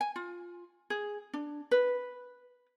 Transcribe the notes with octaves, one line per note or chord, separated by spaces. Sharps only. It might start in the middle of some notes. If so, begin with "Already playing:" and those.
G#5
F4
G#4
D4
B4